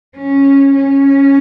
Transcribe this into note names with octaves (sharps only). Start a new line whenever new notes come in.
C#4
C#4